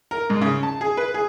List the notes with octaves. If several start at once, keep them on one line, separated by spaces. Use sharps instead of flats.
A#4
G#2
C#3
A5
G#4
B4
G#4